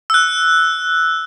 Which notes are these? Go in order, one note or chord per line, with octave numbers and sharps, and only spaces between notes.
E6 F#6